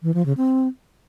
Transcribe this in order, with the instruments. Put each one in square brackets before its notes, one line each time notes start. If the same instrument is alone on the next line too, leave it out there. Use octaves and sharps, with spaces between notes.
[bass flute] E3
F3
C#3
C4